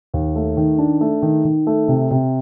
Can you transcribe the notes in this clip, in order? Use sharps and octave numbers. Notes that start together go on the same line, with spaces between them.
D#2
A3
D#3
D4
A3
D#3
D#3
A3
C3
C3